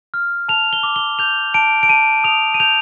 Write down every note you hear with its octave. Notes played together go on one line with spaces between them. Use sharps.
F6
A5 F7
G7
D6
G7
G6 F7
A5 D7
D7
A5 D#7
D#6 F7
D#7
G6 F7